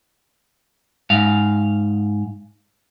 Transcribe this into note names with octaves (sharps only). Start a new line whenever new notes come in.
G#2 F5